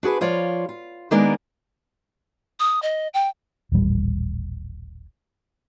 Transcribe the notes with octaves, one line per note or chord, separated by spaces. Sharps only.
D4 F#4 G#4 B4
F3 F4 C#5 D5
F4
D#3 G#3 A#3 B3 D4 A#4
D#6
D#5
G5
D#1 A1 G3